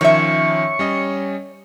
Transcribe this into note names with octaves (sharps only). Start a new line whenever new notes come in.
D#3 F3 C#4 C#5 E5 C#6
G3 C#4 D#5